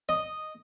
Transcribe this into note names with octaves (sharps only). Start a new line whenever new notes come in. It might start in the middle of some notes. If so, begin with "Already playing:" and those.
D#5